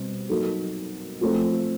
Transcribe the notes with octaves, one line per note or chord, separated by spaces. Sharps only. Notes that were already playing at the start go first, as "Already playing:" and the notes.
Already playing: B2 G3 C4
F#3 A#3 D#4 F#4 A4
F3 A3 C4